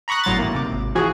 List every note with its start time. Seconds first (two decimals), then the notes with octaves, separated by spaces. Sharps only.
0.08 A#5 B5 C#6 D#6 F#6
0.24 G1 A2 F#3 A#5 C6 A6
0.38 D#2 E3 A#3
0.55 C3 D6
0.72 G#1
0.95 E3 F3 F#4 G#4